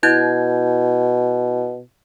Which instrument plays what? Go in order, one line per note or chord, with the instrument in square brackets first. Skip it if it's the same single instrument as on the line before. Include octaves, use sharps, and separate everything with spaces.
[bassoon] B2 [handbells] E4 G6 G#6